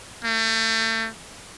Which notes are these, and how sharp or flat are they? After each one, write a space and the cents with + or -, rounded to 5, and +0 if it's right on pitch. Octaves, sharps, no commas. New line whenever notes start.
A3 +35